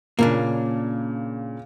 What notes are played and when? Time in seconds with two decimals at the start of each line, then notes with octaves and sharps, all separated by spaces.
0.19 A#2 C#3 A#3 C#4 D4